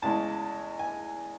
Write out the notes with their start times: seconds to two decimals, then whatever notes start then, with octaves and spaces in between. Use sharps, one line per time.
0.02 E2 C#3 E3 G#3 A5
0.79 G#5